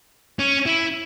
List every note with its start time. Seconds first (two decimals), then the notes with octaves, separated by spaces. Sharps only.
0.39 C#4
0.66 E4